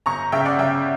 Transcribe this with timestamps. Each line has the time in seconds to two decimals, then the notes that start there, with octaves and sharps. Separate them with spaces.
0.06 G1 A#5 C#6
0.32 C#3 E5 G5
0.45 D5 F#5
0.59 C#3 E5 G5